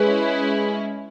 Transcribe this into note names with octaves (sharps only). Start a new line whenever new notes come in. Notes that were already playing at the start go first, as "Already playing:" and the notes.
Already playing: G#3 C#4 E4 G#4 B4